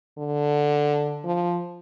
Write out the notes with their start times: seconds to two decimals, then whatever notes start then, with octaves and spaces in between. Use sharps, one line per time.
0.18 D3
1.25 F3